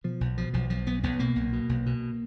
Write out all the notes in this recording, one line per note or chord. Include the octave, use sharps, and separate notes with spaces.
B2 F3
B1
B2 F3
B1 F3
B1 F3
B1 B3
B1 B3
B2 A#3
B1
B2
B1
B2